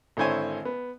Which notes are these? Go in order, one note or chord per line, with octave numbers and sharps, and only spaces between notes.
G#1 D3 E4 C5 C#5 G#5
B3